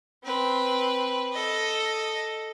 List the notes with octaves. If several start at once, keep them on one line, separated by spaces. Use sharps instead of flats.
C4 B4
A4 D#5